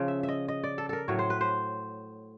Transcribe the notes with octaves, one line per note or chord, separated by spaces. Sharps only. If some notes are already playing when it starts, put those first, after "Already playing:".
Already playing: C#3 F3
E5
E5
D#5
D#5
D5
A4
A4 A#4
A2 F#3 C#5
C5
B4
C5